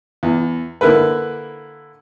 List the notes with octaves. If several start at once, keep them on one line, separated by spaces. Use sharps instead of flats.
E2
D3 A#3 E4 A#4 B4